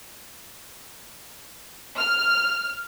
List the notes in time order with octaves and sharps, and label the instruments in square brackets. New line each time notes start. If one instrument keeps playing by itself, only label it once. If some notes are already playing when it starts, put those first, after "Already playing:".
[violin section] F6